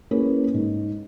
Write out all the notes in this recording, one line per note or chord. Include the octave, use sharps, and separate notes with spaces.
A#3 C#4 E4 G#4 B4
G#2